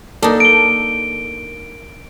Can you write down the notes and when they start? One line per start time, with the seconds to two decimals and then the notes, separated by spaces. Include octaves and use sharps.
0.23 A#3 D4 D#4 A4
0.40 D7 G7